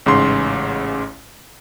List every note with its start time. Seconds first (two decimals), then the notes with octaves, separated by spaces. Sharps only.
0.06 A1 G#2 C#3 C6